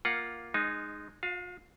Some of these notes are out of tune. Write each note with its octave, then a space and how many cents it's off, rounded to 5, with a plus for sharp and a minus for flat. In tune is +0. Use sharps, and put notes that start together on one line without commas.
A#3 +5 F4 +0 F#5 +0
G#3 +0 D#4 -20
F4 +45 F5 +0